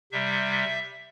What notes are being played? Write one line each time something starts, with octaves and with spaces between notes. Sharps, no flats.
C3 G3 E5